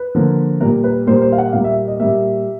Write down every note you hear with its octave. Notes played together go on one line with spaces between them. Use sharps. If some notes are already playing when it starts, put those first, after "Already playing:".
Already playing: B4
D3 F3 A#3
A#2 G3 A#3 A#4
B4
A#2 G3 A#3 C5
C5
F5
F#5
A#2 G3 A#3 F5
E5
D#5
A#2 G3 A#3 E5